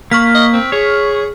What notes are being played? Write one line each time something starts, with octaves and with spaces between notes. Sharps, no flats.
A#3 C#6 F6 B6
D#5
C4
G#4 C#5